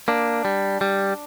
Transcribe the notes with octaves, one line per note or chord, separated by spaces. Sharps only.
A#3 D4
G3
G3